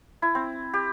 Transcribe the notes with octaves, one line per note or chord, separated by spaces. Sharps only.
E4
C4
G4